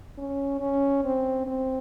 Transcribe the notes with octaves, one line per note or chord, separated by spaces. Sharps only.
C#4
C#4
C4
C4